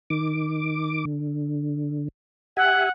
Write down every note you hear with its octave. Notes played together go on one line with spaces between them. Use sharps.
D#3 D6
D3
G4 E5 F#5 G#5